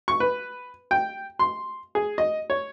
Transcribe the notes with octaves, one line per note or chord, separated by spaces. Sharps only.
C#6
B4
G5
C6
G#4
D#5
C#5